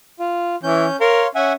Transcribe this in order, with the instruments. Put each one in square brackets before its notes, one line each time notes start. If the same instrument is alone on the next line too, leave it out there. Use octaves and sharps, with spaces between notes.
[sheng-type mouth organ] F4
[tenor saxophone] E3 [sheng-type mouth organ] C#4 G6
[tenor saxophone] A#4 [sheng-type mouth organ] C#5 F5 C6
[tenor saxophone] C#4 [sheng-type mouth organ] E5 F#5 G#5